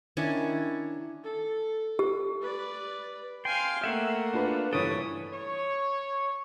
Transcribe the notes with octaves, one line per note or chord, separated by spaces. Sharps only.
D#3 C#4 D4 E4
A4
G4
B4 D5
F5 G5 G#5 C6
A3 A#3 E5 F#5
D4 F4 B4
G2 E3 A4 B4 C#5 D#6 D7
C#5